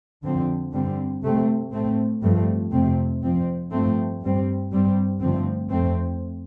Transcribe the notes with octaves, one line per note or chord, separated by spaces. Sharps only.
F2 D3 F3 C4
G2 D3 G3 C4
C3 A3 C4
A2 A3 C4
G2 F3 A3 C4
F2 C3 A3 C4
F2 F3 C4
G2 F3 A3 C4
G2 G3 C4
G2 G3 C4
G2 D3 F3 A3 C4
F2 F3 A3 C4